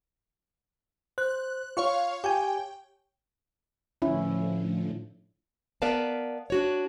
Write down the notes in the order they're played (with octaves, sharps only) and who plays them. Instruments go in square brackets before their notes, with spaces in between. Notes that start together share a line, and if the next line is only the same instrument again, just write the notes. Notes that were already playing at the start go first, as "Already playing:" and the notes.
[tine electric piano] C5 [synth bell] F#6
[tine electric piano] F4 [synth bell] C#5 F5 C#6
[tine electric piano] G4 G#5 [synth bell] G5
[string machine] A2 D3 F3 [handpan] C#4 E4
[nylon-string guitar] B3 A#4 B4 D5 F5 A5
D4 F#4 C#5